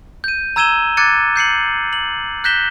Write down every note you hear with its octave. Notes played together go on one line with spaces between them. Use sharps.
G6 D#7
A#5 E6 G#6 D#7 E7 G7
D6 F#6 G#6 A6 C#7 D#7
G6 C7 C#7 F#7
F#7
F#6 G6 A#6 B6 E7 G7